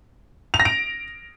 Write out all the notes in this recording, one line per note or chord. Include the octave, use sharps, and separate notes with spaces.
F7
A#6
D7